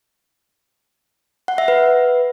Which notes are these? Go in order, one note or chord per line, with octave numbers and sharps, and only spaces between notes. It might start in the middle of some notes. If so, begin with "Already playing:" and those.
F#5
E5
B4